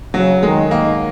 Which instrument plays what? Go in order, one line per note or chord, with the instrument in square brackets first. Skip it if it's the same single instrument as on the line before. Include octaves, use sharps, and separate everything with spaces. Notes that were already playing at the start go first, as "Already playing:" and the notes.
[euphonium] C#3 [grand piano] F#3
[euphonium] D#3 [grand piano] G#3
[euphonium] D#3 [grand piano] A#3